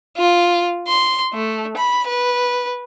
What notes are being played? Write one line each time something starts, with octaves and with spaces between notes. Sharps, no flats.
F4
C6
A3
B5
B4